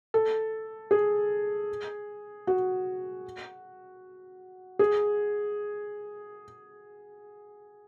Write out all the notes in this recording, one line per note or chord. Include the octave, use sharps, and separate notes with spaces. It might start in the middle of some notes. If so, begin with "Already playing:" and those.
A4
G#4
F#4
G#4